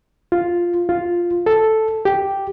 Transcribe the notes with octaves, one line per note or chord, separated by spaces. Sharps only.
F4
F4
A4
G4